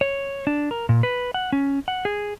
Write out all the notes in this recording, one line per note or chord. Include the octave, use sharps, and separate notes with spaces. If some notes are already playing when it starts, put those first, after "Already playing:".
C#5
D4
A#4
A#2
B4
F#5
C#4
F#5
G#4